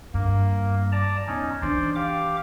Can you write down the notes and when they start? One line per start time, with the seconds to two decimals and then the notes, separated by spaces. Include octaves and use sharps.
0.14 G2 A#3
0.92 D5 A5 A#5
1.27 E2 C#4 D#4
1.62 E3 D4 C5 D5
1.95 G4 F5 D6